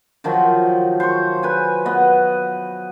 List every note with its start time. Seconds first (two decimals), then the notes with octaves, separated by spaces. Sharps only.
0.24 D#3 F3 F#3
1.00 C5 C#6
1.43 B4 G#5
1.85 B3 D#5